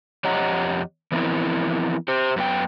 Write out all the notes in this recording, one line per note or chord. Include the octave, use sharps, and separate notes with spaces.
F2 G4 C#5 D#5 F#5 A#5
E3 F3 B3 C4 E4 A#4
G4 C5
F#2 B3 G5